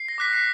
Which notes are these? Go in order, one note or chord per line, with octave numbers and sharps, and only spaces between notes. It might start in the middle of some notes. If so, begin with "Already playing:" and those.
Already playing: C7
A#6
D6 F#6 B6
C7